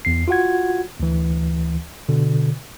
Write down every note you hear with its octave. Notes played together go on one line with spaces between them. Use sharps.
E2 C7
F4 F#4 F#5 G#6
D2 E3
B2 D3